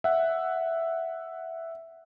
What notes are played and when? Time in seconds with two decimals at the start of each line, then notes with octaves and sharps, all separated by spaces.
0.04 E5 F#5